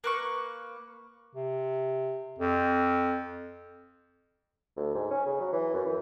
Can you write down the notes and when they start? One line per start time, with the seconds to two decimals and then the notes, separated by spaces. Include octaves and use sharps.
0.04 A#3 B4 C#6
1.35 C3
2.39 F2
4.76 D2
4.95 G#2
5.10 C#4
5.26 C#3
5.40 F#3
5.53 E3
5.74 F#2
5.86 E3